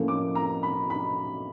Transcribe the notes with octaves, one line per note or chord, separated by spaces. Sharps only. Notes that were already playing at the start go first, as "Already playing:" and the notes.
Already playing: A2 F3 A#3 C#4
D6
A#5
B5
B5